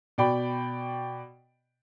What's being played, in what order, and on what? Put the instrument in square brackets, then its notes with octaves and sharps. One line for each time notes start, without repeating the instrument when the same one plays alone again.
[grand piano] B2 D5 G5 B5